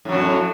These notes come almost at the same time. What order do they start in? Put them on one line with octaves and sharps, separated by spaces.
A2 F#3 F2